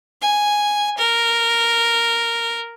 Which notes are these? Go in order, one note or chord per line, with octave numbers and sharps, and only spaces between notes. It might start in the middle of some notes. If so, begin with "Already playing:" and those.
G#5
A#4